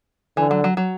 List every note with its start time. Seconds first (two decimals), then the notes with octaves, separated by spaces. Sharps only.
0.37 D3 E3
0.51 F#3
0.64 F#3
0.77 F#3